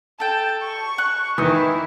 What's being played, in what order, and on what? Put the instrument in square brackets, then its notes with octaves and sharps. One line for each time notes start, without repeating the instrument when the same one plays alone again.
[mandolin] A4 G5 [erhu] A5
[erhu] C#6
[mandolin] F#6
[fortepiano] D#3 E3 [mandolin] D#4 [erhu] E4